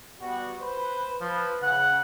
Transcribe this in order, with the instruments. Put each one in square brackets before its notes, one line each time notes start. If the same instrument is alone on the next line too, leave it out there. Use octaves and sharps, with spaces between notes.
[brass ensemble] G3 B3 F#4
[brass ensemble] B4 [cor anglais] C5
[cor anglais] F3 [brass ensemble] B4
[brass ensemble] C#3 [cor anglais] F#5